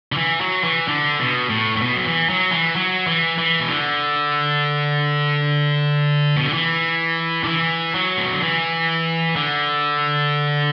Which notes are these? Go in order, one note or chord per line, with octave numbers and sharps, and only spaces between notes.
D3
E3
F#3
E3
D3
B2
A2
A2
B2
F#3
E3
F#3
E3
F#3
E3
E3
B2
D3
B2
D3
E3
D3
E3
F#3
A2
B2
D3
E3
D3